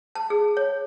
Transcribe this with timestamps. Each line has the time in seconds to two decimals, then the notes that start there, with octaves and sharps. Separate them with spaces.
0.15 A5
0.30 G#4
0.57 C#5